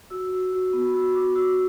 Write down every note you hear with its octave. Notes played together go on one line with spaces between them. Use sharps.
F#4 E6
F#4
F#4
B3
F#4 E6
F#4 D6
F#4 E6